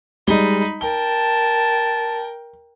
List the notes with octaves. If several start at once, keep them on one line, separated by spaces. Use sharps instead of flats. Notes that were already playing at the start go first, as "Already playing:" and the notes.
G3 G#3 D#4 B5 G7
A#4 G5 A5 G7